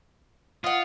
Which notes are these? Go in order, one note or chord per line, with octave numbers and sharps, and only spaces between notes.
F4 D#5 F#5